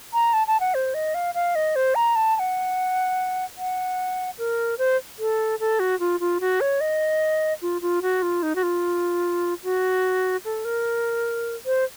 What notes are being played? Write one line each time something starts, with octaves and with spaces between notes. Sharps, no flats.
A#5
A5
A5
F#5
C5
D#5
F5
F5
D#5
C5
A#5
A5
A5
F#5
F#5
A#4
C5
A4
A4
F#4
F4
F4
F#4
C#5
D#5
F4
F4
F#4
F4
D#4
F#4
F4
F#4
A4
A#4
C5